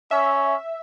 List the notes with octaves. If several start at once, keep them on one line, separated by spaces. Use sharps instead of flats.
C#4 E5